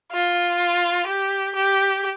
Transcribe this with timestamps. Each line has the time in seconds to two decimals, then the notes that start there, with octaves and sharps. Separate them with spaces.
0.12 F4
1.07 G4
1.55 G4